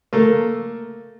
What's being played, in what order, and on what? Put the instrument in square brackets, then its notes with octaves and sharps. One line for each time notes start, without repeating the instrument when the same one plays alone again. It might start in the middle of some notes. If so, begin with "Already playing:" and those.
[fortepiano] A3 A#3